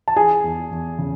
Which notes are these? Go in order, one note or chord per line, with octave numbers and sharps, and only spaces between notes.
A5
E3 G#4 G#5
E2
E2
C#3